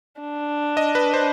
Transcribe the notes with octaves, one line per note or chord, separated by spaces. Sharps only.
D4
D#5
B4
C5